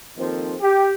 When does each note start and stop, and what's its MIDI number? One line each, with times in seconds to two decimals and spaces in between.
0.18 0.55 39
0.18 0.55 51
0.18 0.55 53
0.18 0.55 60
0.18 0.55 69
0.61 0.92 67